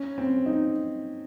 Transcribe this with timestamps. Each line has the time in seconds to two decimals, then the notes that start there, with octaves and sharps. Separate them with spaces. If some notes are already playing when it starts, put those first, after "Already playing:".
Already playing: C#4
0.18 C4
0.46 D#4